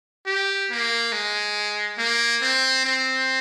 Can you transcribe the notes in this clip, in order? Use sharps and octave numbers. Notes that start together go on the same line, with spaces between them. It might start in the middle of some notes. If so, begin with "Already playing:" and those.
G4
A#3
G#3
A#3
C4
C4